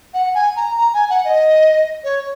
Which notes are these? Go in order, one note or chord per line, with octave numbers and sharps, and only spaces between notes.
F#5
G#5
A#5
A#5
G#5
F#5
D#5
C#5